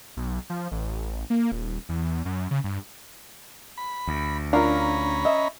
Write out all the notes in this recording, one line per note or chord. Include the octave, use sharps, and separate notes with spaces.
B1
F3
A1
A#3
D#1
E2
F#2
C#3
G2
B5
D2
C#4 D4 F4 A#4 F5 A#5 B5
D#5 E5